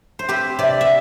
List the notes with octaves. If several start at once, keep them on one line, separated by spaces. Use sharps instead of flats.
C5
C4 G4 B4
C3 B4 D5
E5